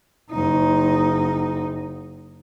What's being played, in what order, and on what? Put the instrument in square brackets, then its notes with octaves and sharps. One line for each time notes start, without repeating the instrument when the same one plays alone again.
[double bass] F#1 D#4